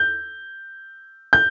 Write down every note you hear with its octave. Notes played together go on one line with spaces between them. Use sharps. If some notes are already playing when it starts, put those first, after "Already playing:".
Already playing: G6
G6